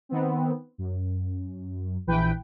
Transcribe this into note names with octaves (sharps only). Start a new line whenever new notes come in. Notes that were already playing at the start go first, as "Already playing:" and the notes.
D#3 B3 C4
F#2
A#1 E3 B4 G5